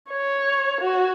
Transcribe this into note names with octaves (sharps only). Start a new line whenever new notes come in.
C#5
F#4